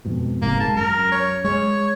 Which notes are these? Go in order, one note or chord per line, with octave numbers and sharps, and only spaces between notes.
F2 G#2 B2
F#1 G#2 C3 A#3
G#1 G#3 A5
F#2 A#4
C#5
G#3 C#5